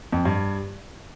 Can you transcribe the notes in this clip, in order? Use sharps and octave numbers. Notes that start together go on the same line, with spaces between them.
F2
G2